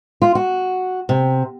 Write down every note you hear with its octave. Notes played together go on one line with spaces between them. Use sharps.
F4
F#4
C3